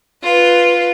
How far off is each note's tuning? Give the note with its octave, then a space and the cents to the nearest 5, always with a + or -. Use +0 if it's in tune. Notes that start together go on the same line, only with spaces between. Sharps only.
F4 +0 B4 +0